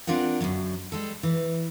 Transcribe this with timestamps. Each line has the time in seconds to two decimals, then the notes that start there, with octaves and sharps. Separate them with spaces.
0.07 C4 D4 F4 A#4 F#5
0.40 F#2 D3 E3 F#3
0.92 G3 G#3 A4
1.23 E3